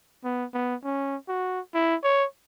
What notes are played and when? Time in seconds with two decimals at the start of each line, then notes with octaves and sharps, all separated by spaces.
0.24 B3
0.54 B3
0.84 C#4
1.28 F#4
1.74 E4
2.03 C#5